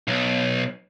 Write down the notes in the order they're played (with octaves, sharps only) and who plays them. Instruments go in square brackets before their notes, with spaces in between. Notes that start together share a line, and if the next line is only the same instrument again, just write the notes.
[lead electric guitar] B1